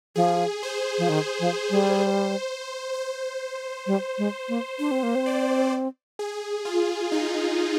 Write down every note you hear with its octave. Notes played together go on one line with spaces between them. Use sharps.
F3 G#4
C5
F3
D#3
F3
G3
C5
G3
G#3
A#3
D4 C5
C4
A#3
C4
D5
G#4
F4
D#4